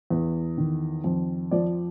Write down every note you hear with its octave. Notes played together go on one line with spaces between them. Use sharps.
E2
D#3
F2
F3 D5